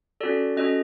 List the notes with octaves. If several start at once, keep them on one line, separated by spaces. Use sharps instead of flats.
C#4 F#4 A4 D5
C#4 F#4 A4 D#5